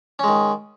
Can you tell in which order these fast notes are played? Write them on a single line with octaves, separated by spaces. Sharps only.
C#4 G#3 D#3